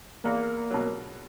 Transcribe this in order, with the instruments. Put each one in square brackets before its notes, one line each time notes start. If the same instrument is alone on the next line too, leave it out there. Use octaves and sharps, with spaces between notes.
[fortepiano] E2 [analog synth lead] A#3
[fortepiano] B2 F#3